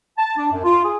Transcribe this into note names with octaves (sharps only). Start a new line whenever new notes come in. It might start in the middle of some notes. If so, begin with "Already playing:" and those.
A5
D4
F#2
F4
G#4